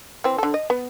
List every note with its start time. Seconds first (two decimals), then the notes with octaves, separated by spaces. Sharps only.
0.24 E3 C4
0.38 D3 A4
0.54 D#5
0.70 B3